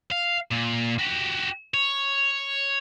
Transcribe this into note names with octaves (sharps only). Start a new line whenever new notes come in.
F5
A#2
F#4 G4
C#5